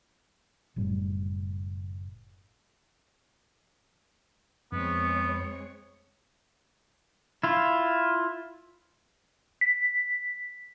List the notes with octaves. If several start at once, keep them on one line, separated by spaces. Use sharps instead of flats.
F#1 A2 G3
F2 G#3 B3 C4 C#5
E4 F4
B6